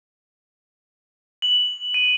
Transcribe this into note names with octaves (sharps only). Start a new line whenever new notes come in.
F#7
D#7